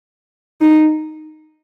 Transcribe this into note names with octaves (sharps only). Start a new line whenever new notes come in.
D#4